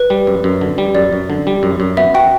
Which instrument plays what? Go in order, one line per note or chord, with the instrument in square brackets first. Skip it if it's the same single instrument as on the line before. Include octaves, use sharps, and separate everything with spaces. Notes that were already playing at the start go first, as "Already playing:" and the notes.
Already playing: [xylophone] B4
[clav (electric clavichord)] G3
F#2
F#2
D3
G3
[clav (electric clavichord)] F#2 [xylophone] D5
[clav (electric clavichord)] F#2
D3
G3
F#2
F#2
[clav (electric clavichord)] B3 [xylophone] E5
[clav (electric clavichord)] F#4 [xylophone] G5